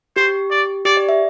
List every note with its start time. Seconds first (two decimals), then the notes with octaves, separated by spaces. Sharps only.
0.16 G4 C5
0.51 D5
0.85 G4 D5
0.97 D5
1.09 E5